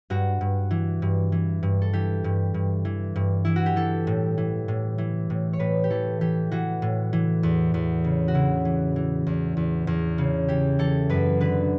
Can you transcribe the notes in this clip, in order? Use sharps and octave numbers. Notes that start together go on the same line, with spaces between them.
G2 F#4
G2
E3
G2
E3
G2
A4
E3 G4
G2
G2
E3
G2
E3 E4
F#4
G4
E3 A4
A2
E3
A2
E3
A2
C#5
A2 B4
G4
E3 A4
E3 G4
E3 F#4
A2
E3
E2
E2
C#3
F#4
C#3 E4
E3
E3
E2
E2
E2
C#3
E3 G4
E3 A4
F#2 B4
D3 B4